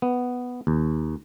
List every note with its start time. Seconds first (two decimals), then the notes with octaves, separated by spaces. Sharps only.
0.02 B3
0.67 D#2